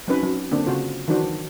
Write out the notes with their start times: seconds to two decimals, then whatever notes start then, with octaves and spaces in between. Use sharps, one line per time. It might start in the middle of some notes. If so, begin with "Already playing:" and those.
0.08 F#3 C4 C#4 D#4 B4
0.23 F#3 C#4
0.51 D3 A#3 C4 D4
0.66 C#3 F4 F#4 C5
1.08 D#3 E3 F#3 D4 F#4 C5